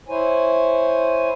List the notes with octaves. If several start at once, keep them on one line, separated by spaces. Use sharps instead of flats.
E4 C5 C#5 G#5